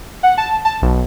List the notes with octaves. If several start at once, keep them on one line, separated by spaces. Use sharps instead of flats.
F#5
A5
A5
B1